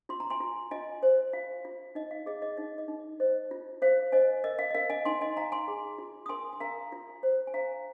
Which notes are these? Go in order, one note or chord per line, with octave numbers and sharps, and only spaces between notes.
F4 C6
A#5
G#5 C6
F4
F4 D#5 G#5
C5
F4 F5
F4
D#4 D#5
F5
G#4 D#5
D#5
D#4 D#5
D#5
D#4
D#5
C5 D#5
F4
C5 F5
C5 D#5 G#5
A#4 D#5
F5
D#5
A#4 F5
D#5 G#5
D#4 G#5 C6
D#5 G#5
D#4 F5 A#5
G#5 C6
G#4
F4
D#6
A#4 G#5 C6
G#5
A#4 F5 A#5
F4
C5
G#5
C5 F5 A#5